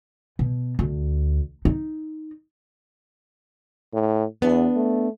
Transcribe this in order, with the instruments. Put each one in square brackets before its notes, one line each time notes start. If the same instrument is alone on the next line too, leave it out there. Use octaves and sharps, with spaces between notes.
[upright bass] B2
D2
D#4
[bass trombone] A2
[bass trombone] E2 [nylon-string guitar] B3 D4
[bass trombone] A3